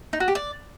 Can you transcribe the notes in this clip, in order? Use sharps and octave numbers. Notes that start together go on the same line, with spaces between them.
D#4
F#4
G4
D5